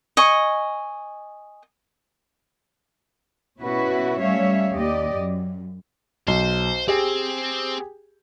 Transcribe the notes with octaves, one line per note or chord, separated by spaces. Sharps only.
D#5 G#5 C#6
B2 C#4 E4 F#4 B4
G3 A3 C#4 C#5 E5 F5
D#2 G4 D5 D#5
F#2
B1 C5 G7
C4 G4 G#4